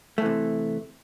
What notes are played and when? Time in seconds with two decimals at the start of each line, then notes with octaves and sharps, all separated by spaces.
0.18 A3
0.22 E3
0.26 C3